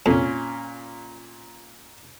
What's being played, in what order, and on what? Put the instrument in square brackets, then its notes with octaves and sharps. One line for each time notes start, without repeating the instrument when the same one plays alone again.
[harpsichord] F2 [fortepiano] A#2 C#4